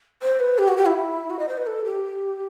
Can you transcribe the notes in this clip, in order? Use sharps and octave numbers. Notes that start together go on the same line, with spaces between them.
C5
B4
G4
F#4
G4
E4
F#4
D#5
C5
B4
A4
G4